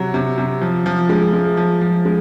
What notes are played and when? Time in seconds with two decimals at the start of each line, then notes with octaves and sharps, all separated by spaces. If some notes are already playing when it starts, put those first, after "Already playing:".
Already playing: C3 F#3
0.14 C3
0.38 C3
0.61 F3
0.86 F3
1.09 G#3
1.33 G#3
1.57 F3
1.81 F3
2.05 G#3